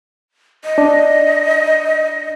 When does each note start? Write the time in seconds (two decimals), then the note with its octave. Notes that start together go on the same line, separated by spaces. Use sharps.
0.65 D#5
0.78 D4